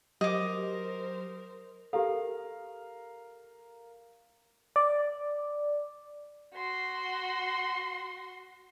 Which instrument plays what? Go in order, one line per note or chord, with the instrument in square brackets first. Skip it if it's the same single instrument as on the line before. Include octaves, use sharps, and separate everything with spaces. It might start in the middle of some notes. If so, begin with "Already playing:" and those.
[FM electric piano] F#3 G4 [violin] A#4 C5 [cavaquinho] D#5 D6
[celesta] G4 A4 [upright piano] A#4 F5
[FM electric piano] D5
[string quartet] F#4 C6